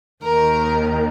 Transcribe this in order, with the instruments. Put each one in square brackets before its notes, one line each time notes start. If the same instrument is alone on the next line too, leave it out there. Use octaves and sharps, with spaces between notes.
[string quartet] D#2 D#3 A#4